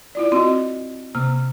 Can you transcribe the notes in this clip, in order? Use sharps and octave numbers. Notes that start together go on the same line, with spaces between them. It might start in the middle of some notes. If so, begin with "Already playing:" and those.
E4 F4 D5
C4 F4 F#4 D#5
C3 A#3 F6